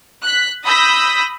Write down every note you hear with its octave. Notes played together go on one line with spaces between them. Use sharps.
F#6 B6
B5 D#6 E6 G6 A#6 B6